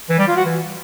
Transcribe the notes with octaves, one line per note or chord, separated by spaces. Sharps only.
E3
G3
F4
F#4
E3